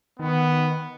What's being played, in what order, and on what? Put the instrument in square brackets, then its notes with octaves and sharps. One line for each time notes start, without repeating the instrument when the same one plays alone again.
[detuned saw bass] D#3 [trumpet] B3